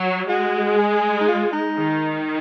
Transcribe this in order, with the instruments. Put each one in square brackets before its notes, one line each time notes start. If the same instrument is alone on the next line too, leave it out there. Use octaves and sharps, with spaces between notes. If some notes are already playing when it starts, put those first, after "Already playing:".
Already playing: [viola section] F#3
[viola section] G#3 [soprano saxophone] F#4
[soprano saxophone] G#4
D#4
F4
D#4
[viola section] D#3